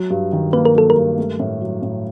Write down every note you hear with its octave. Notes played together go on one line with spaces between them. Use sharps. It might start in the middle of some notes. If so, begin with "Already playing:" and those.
Already playing: F#3
G2
D#3
A#3 B4
A#4
F#3 A4
A#4
G2
A3
A2
F#3
A2